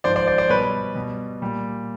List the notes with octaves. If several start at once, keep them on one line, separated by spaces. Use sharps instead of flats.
G#2 F3 C5 D5
C5 D5
C5 D5
C5 D5
B2 G3 B4 C#5
B2 G3
A#2 G3